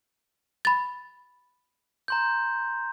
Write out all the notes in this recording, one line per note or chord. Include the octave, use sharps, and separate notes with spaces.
B5 A6
A#5 C6 G6